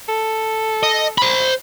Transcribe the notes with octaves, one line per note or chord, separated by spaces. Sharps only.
A4
D#5
C5 B5